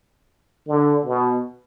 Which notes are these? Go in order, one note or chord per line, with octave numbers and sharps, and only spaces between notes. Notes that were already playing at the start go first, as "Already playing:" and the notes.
D3
B2